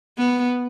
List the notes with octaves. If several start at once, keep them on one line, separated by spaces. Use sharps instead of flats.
B3